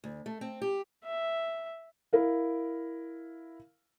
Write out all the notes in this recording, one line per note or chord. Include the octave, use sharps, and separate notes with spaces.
D2
A3
C4
G4
E5
E4 A#4 F5